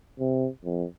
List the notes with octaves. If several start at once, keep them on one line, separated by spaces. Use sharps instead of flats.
C3
F2